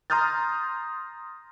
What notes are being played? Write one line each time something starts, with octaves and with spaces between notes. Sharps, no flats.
A#5 C6 D#6 F6 G6 A6